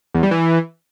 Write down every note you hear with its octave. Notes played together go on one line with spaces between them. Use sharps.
E2
G3
E3